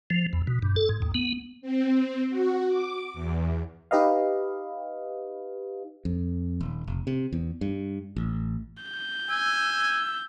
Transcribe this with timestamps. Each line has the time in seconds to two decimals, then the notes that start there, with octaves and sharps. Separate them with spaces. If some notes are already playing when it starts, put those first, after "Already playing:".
0.10 F3
0.33 E2
0.47 B2
0.62 G2
0.76 A4
0.89 G#2
1.02 D#2
1.15 B3
1.61 C4
2.30 F#4
2.69 D6
3.14 E2
3.91 D#4 G4 B4 D#5 F5
6.05 F2
6.60 D#1
6.87 F1
7.07 C3
7.33 E2
7.61 G2
8.16 A1
8.83 G6
9.29 G#5 E6